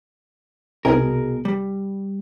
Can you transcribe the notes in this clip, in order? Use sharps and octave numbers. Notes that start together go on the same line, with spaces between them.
C2 B2 G#4 A#4
G3